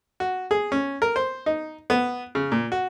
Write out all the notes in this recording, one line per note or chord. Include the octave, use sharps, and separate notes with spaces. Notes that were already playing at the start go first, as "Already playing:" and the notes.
F#4
G#4
C#4
A#4
C5
D#4
B3
C#3
A#2
F#4